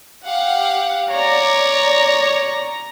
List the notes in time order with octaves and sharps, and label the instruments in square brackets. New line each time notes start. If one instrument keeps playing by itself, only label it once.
[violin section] G4 F5 F#5
[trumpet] C#5 [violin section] D5 [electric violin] A#5